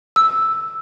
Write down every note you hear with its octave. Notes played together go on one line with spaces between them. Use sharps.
E6